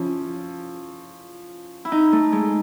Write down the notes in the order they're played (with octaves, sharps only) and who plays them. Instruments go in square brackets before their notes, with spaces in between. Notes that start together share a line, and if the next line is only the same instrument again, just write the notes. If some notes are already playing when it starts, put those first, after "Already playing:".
Already playing: [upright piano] F3 C#4 [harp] E4
[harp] E4
D#4
A3
G#3